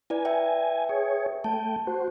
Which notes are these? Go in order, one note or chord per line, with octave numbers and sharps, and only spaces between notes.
E4 B4 D5 G#5
B4 E5 G5
G#4 C#5
A3 G5 A5
F#4 C5